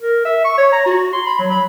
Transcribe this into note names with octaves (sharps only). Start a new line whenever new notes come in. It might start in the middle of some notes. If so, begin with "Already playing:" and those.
A#4
E5
C#6
C#5
A#5
F#4
C6
B5
F#3
B5